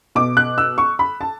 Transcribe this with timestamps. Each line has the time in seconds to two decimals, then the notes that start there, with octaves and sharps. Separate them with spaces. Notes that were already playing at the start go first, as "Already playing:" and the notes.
0.15 B2 D6
0.37 F#6
0.58 E6
0.78 C#6
0.99 B5
1.21 A5